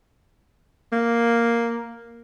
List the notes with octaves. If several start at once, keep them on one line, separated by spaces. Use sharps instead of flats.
A#3